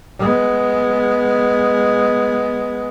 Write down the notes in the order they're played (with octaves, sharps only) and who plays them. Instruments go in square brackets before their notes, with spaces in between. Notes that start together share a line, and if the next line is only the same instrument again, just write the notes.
[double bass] G#3 B3